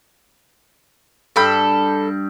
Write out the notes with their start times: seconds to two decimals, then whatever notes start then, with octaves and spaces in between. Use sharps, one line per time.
1.36 G2 A4 G5 B5